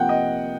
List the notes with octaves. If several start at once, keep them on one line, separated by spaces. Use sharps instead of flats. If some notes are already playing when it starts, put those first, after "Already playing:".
Already playing: C3 F3 A#3 F#5 G5
D#5